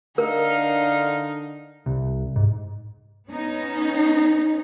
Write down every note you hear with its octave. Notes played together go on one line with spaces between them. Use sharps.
D3 D#4 A#4 F5
C2
G#2
B3 C#4 D#4